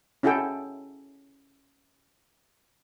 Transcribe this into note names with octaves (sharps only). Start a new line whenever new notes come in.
C#4 E4 F#4 G#4 A4 G5